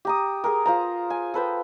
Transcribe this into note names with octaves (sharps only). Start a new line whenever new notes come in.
G4 A#5 D#6
G#4 A#4
F4 C5 A#5
G#5
A4 B4 C5 G5